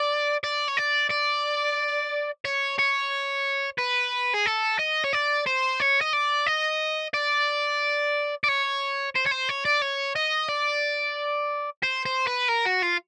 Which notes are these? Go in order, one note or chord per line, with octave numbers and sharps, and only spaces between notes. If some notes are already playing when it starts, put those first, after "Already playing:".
Already playing: D5
D5
C#5
D5
D5
C#5
C#5
B4
G#4
A4
D#5
C#5
D5
C5
C#5
D#5
D5
D#5
D5
D5
C#5
C5
C#5
C5
C#5
D5
C#5
D#5
D5
C5
C5
B4
A#4
F#4
F4